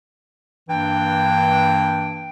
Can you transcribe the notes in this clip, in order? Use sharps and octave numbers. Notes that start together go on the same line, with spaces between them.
G2 E3 A#3 D4 G5